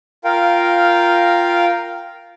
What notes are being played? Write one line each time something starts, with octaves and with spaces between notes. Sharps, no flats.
F4 A#4 F5 G5